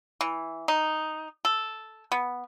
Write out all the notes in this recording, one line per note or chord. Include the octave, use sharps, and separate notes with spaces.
E3
D#4
A4
B3